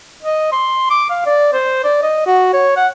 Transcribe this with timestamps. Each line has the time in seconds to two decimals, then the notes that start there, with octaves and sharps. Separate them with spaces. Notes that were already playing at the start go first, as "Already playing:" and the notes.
0.23 D#5
0.52 C6
0.90 D6
1.10 F5
1.26 D5
1.53 C5
1.84 D5
2.02 D#5
2.26 F#4
2.53 C#5
2.76 F#5